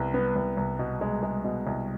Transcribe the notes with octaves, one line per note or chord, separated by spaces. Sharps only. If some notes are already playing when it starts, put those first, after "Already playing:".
Already playing: C2 B3
B3
C2
C2
B2
G#3
G#3
B2
C2